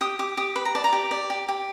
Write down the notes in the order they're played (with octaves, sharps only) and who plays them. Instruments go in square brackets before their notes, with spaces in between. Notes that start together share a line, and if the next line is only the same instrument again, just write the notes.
[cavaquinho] G4 D#6
G4 D6
G4 D#6
B4 B5
A#5
D5 A5
A#5
G4
D5
G4
G4